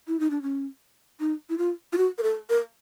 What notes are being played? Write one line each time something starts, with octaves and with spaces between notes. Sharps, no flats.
E4
D#4
D4
C#4
D#4
E4
F4
F4
F#4
A#4
A4
A#4